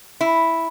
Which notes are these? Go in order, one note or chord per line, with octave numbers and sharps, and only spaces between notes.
E4